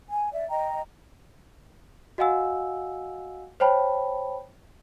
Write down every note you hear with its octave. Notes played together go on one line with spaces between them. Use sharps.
G#5
D5 E5
D#5 G5 A#5
F#4 D#5 F5 F#5 G#5 E6
C5 C#5 G5 A5 B5